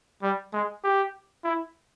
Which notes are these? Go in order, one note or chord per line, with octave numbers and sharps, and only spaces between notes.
G3
G#3
G4
E4